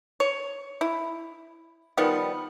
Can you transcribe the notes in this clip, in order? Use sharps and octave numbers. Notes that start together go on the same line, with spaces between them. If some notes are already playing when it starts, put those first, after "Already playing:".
C#5
E4
D#3 F3 G3 B3